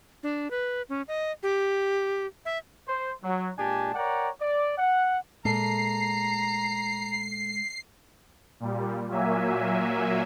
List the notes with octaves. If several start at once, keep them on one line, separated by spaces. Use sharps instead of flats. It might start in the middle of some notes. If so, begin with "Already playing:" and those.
D4
B4
C#4
D#5
G4
E5
C5
F#3
A#2 G#3 D4 G4 G#5 A5
A#4 C#5 D5 F#5 G5 A#5
D5
F#5
A#2 G#3 A3 A5 A#5 C7
A#2 G3
A#2 F#3 A#3 E5 G#5